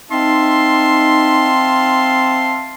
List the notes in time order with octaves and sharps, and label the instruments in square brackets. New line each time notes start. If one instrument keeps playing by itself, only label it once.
[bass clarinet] C4 [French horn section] D#4 [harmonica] E5 F5 A5 [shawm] C6